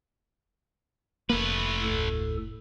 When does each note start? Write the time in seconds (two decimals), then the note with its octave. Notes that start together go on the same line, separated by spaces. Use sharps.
1.30 F1 A3 A#3 B4
1.82 D2 A2 A4